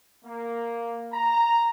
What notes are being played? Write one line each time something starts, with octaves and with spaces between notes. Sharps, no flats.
A#3
A#5